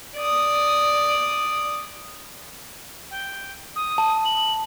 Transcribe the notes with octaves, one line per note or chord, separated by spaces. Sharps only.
D5 D#6
G5
D#6
A5
F#7